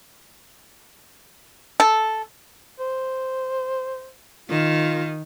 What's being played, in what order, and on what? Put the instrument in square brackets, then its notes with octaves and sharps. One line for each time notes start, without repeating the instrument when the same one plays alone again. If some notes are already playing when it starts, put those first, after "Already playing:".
[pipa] A4
[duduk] C5
[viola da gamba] D#3 [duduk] F4